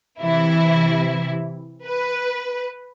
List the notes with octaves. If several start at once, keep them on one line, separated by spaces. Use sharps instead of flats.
C3 E3 E4
B4